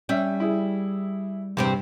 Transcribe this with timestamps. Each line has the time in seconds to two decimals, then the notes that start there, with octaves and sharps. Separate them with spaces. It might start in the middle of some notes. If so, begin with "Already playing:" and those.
0.09 G3 C#4 E5
0.40 E4 G#4
1.57 E2 G2 C3 C4